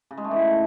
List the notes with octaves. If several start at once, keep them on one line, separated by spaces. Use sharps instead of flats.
C#3
G#3
A3
E3